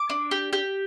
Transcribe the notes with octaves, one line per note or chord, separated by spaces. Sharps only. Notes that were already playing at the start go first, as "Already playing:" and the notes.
Already playing: D6
D4
G4
G4